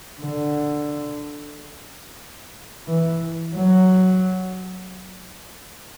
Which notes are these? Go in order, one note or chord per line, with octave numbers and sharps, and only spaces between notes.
D3
E3
F#3